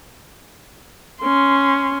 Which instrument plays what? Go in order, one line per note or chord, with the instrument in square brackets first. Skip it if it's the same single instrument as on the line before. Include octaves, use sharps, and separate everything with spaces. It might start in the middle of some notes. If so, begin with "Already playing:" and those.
[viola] C#4 C6